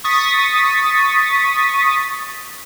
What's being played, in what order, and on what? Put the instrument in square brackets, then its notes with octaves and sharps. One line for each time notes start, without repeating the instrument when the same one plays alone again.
[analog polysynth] C#6 D#6 A6 B6